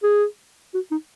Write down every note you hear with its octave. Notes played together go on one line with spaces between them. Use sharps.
G#4
F#4
D#4